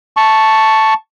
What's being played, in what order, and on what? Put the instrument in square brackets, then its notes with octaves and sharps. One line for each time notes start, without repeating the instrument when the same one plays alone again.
[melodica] A5 C#6